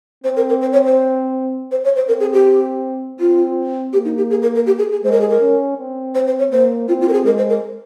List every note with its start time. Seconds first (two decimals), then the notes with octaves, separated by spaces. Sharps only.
0.24 C4 C5
0.36 A#4
0.49 A#4
0.61 C5
0.73 C#5
0.86 C5
1.71 C5
1.85 C#5
1.96 C5
2.08 C4 A#4
2.20 G#4
2.33 G4
3.20 C4 F4
3.93 A#3 G4
4.05 D#4
4.17 G4
4.30 G#4
4.42 A#4
4.55 A#4
4.67 G4
4.79 G#4
4.92 G#4
5.04 G#3 C5
5.12 A#4
5.21 G#4
5.29 A#4
5.41 C#4
5.78 C4
6.15 C5
6.27 C5
6.39 C#5
6.52 A#3 C5
6.88 C4 F4
7.01 F4
7.08 A#4
7.13 G#4
7.25 G#3 A#4
7.38 C5
7.49 A#4